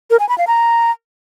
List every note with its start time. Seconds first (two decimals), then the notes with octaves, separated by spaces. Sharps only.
0.10 A#4
0.20 G#5
0.29 B5
0.38 F5
0.47 A#5